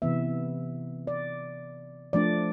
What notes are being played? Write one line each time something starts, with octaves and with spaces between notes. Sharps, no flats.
C3 E3 B3 E5
D5
F3 A3 D4 D5